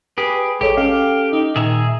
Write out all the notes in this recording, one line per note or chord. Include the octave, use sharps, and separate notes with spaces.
G4 G#4 B4
A1 G#3 G4 A4 C#5
C#4 G4 A4 F5
D#4
A#2 D#3 G#4 E5 A#5